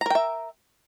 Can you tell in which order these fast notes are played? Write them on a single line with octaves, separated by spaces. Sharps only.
A#5 A#4 G5 E5